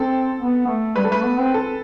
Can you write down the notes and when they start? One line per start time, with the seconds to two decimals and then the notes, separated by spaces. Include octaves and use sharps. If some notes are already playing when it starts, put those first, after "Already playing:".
Already playing: C4 A4
0.39 B3
0.67 A3
0.96 G3 B4
1.04 A4
1.10 A3 B4
1.25 B3
1.39 C4
1.54 A4